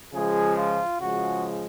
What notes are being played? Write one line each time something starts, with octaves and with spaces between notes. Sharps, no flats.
C#3 F3 G#3 G#4
F4
C#3 F3 G#3 F#4